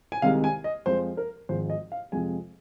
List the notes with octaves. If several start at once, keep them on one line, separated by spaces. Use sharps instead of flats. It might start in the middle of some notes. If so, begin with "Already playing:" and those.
G#5
C2 C3 D#3 G#3 F5
G#5
D#5
F2 F3 G#3 C5
A#4
G#1 G#2 F3 G#3 C5
D#5
F5
F2 C3 F3 G#3 G#5